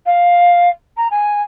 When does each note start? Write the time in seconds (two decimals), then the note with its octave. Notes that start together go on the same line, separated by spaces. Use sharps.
0.05 F5
0.96 A#5
1.10 G#5